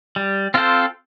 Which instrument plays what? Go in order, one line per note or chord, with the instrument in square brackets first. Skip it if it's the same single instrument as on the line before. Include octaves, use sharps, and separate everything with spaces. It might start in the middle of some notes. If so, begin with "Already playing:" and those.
[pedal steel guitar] G3
C4 F4 A4 C5